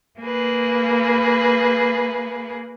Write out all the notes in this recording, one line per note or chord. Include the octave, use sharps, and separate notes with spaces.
A#3 G#4 B4